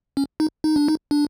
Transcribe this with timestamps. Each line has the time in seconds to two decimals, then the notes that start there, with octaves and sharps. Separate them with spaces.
0.17 C#4
0.40 D#4
0.64 D#4
0.76 D4
0.88 D#4
1.11 D4